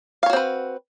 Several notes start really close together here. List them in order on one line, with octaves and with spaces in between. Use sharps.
F5 C#5 F#4 C4 B4